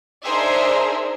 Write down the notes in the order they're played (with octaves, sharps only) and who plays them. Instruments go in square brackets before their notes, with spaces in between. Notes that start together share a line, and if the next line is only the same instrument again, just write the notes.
[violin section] D4 D#4 G#4 A#4 C5 E5